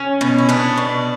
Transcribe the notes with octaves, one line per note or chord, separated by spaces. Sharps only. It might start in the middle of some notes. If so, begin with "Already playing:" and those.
Already playing: C#4
B2
E4
B3 D4
B2